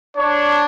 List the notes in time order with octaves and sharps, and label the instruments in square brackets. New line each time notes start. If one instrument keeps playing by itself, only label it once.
[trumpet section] D4 [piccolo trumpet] C#5